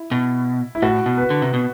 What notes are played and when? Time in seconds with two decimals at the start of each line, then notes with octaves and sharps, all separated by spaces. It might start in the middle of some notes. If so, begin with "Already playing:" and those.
Already playing: E4
0.11 B2
0.75 E4
0.82 A2 F#4
1.06 B2
1.18 B4
1.30 D3
1.42 C3
1.53 B2